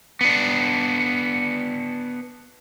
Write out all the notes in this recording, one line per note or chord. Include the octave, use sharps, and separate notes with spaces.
B3 D4